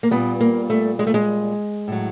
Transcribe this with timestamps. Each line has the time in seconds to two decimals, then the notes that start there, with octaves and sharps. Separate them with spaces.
0.03 A#3
0.11 A#2 G3 B3
0.41 A#3
0.70 A3
0.99 G#3
1.07 A3
1.14 G#3
1.88 A2 F#3